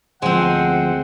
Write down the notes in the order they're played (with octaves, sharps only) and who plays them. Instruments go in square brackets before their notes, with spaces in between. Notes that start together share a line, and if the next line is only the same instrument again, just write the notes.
[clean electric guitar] D2 F3 [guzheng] G#3 C4 [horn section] C5 F#5